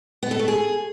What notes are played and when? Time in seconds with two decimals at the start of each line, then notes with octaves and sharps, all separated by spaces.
0.23 B3
0.31 A4
0.39 A3
0.48 G#4